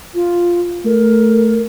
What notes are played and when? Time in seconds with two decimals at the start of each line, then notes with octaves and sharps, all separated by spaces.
0.14 F4
0.85 A3 A#4